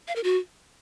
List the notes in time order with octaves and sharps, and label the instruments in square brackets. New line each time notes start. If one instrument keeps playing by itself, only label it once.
[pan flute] F5
A#4
F#4